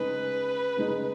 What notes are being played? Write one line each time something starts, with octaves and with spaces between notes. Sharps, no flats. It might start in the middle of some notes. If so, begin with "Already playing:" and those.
Already playing: C#3 G#3 D#4 G#4 B4
C#3 G#3 D#4 G#4